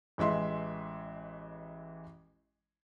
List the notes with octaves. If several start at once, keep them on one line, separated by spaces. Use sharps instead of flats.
A1 E3 G#3 E5 C6